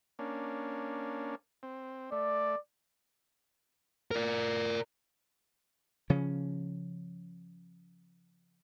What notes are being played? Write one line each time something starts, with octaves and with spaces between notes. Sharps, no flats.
A#3 C#4 D4
C4
A3 D5
A#4 D5
C#3 F3 C#4